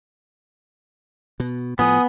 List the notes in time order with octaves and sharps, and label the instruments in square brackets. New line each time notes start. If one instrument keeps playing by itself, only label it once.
[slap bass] B2
[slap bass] A2 F3 [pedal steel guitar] B3 [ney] G#5 [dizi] D#6